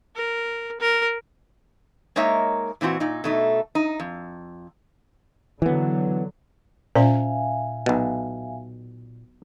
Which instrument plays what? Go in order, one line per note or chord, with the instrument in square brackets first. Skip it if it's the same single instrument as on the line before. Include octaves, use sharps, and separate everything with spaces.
[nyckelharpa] A#4
A#4
[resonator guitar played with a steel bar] G#3 A#3 D#4 A#4 C#5 E5
A#2 E3 C4 F4 F#4
A#2 D#4
B2 A3 D#4
D#4
F2
[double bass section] D3 F#3 [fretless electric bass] E3 B3
[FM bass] A#2 [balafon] C#4 C5 [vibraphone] E5 F5 G#5
[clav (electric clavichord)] B1 B2